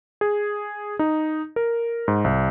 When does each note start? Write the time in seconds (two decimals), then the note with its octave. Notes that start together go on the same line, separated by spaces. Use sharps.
0.21 G#4
0.99 D#4
1.56 A#4
2.08 G#2
2.24 C2